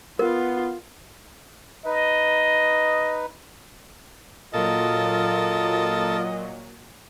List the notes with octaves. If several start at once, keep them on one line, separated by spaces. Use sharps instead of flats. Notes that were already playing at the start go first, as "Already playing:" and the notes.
B3 F4 A#4
D#4 B4 D#5
A#2 F#3 F4 A4 A#4 D#5